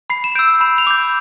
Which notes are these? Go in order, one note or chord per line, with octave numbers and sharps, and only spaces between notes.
B5 C7
E7
E6 G6 D7
B5 E7
F7
D6 G6